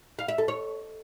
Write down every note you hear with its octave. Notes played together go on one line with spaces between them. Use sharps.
F5
E5
A4
C#5